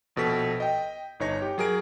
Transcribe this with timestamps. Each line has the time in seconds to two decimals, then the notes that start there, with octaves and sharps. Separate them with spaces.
0.16 A#1 B2 A4 B6
0.60 D#5 G5
1.20 G1 D#4 C#5 A#6
1.42 G4
1.58 F#3 G#4 A#4 D7